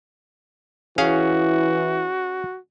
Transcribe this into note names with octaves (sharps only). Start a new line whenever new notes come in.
E3 C#4 E4 F#4 G#4 F5